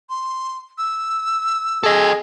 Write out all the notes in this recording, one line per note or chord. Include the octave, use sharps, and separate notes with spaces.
C6
E6
G#4 A4 D#5